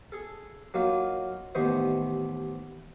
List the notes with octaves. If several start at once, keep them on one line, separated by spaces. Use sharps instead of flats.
G#4 A4
F#3 A#3 D#4 F4
A1 D#2 B3 C5 D#5 C#6